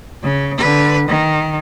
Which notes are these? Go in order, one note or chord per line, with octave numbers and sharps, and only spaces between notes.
C#3
D3 B4
D#3